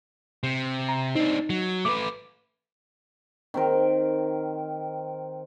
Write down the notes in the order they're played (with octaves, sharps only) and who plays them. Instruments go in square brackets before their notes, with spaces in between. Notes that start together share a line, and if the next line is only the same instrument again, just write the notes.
[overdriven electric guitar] C3
[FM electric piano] A#5
[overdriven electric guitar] C4 D4 [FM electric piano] D#4
[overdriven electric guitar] F#3
[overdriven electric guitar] A3 B4 [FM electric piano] D6
[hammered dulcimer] D#3 C4 A#4